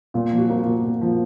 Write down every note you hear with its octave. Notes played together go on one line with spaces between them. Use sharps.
A#2 F4
F3
F#4
A#3
A#2 F4
A#2
F3